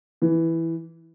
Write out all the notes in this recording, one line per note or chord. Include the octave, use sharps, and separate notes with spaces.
E3